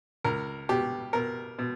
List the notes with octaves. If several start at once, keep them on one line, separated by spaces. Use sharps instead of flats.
C#2 A#4
B2 G4
B2 A#4
B2